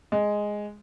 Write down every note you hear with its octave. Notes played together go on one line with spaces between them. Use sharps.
G#3